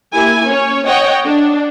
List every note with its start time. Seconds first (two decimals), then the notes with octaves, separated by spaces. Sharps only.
0.13 A#3 E4 G4 G#5
0.46 C#4 C#5
0.86 C#5 D#5 F#5 G5
1.25 D4